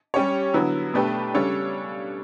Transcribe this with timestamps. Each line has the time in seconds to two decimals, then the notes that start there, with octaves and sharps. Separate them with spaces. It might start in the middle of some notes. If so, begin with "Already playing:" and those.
0.14 G3 C#4 G4 C#5
0.54 D3 F#3 B3 E4
0.94 B2 A3 D4 G4 B4
1.34 C#3 G3 D4 A4 C#5